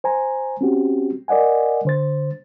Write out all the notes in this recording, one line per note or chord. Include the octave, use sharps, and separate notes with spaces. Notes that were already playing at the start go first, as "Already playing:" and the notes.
C5 G#5 A#5
C4 C#4 F#4 G4
A#4 D5 D#5 F#5 G#5
D3 C5 A6